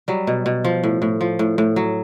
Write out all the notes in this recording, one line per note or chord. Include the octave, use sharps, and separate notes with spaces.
F#3 G3
B2
B2
F3
A2
A2
F3
A2
A2
F#3